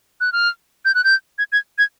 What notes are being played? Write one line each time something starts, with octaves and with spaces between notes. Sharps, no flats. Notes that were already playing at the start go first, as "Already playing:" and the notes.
F#6
F6
G6
F#6
G6
G#6
G#6
G#6